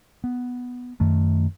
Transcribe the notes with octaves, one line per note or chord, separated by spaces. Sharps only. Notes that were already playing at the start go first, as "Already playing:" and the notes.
B3
F#2 D#3 A3